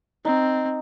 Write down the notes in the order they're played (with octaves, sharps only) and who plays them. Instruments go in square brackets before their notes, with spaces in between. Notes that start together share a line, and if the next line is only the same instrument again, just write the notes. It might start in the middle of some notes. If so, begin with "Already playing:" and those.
[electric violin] C4 [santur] D#4